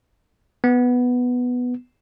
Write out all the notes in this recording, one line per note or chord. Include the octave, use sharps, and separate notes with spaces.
B3